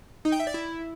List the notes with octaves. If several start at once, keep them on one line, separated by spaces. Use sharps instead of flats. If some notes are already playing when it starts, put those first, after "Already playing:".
D#4
G5
E5
D5
E4